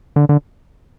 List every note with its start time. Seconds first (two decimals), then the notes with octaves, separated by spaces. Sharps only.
0.16 D3
0.29 D3